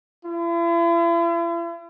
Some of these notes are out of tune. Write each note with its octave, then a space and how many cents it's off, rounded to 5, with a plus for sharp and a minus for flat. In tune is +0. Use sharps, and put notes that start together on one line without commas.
E4 +45